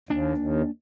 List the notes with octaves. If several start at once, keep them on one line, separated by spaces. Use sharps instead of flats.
D#2 A#3 D4
D#2